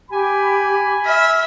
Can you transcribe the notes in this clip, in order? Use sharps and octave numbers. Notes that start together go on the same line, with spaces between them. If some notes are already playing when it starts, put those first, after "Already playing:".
G4 G#5 B5
E5 F6